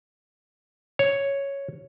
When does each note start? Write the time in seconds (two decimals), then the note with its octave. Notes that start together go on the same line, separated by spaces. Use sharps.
0.99 C#5